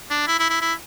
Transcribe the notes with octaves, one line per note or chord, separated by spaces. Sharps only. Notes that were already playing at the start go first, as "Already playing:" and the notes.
D4
E4
E4
E4
E4